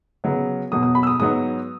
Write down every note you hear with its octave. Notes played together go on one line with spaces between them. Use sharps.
C#3 F#3 B3
E2 B2 F#3 B3 D#6
D#6
B5
E6
D#6
G#2 F#3 B3 D#6